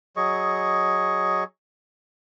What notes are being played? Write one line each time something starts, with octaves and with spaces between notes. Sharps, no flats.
F#3 G#4 D#5 C#6